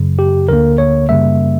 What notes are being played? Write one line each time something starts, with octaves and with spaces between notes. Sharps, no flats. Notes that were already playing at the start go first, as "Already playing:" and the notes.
Already playing: F#2 C#3 F#3
G4
D2 D3 A#3 A#4
C#5
F#2 C#3 G3 A#3 E5